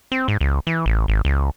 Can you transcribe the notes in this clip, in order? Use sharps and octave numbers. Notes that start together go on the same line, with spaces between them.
C4
G#2
C#2
E3
A1
G#1
C#2